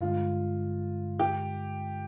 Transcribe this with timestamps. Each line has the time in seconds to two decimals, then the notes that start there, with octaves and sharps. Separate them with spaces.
0.01 G2 D3 G#3 F4
1.19 G4